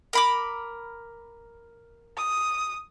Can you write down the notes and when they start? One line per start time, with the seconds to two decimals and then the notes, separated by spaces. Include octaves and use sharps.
0.13 A#4 B5 D6
2.17 D#6